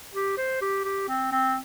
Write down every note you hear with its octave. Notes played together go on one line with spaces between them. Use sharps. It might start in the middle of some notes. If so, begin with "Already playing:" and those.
G4
C5
G4
G4
C4
C4